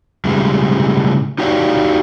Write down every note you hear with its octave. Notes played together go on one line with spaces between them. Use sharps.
A2 C#3 G3 G#3
D#4 F#4 G4 C#5 D5 F5